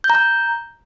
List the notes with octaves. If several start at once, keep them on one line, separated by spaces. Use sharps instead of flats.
G6
A#5
G6